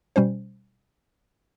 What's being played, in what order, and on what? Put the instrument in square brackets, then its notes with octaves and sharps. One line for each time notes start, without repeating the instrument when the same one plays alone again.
[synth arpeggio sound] B2 G3 C#4 C5